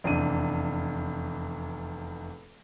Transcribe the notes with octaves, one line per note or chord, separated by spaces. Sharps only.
F1 E2 D4 D#7